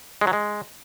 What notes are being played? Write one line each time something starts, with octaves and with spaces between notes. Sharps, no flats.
G#3
F#3
G#3